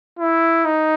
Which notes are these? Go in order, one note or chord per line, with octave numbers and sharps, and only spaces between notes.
E4
D#4